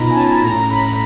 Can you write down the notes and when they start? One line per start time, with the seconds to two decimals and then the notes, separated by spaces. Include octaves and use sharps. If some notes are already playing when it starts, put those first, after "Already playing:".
Already playing: B2 D#4 F4 A#5 B5
0.10 G#5
0.15 C#4 A5
0.43 A2 A#5
0.70 A2 B5